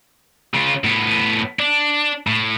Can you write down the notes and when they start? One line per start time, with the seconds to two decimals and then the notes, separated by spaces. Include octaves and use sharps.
0.54 C#3 F4
0.84 A2 B3
1.59 D4
2.27 A2